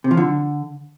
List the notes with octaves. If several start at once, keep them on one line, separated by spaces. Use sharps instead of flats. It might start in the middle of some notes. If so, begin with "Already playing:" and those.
C3
F3
D3